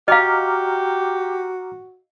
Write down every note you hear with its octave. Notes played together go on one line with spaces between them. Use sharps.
F#4 G4 D#5 F5 A#5 D6 F6